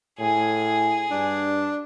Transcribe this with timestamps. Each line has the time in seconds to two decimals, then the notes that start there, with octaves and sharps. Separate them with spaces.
0.20 A2 G#4 G#5
1.11 G2 D4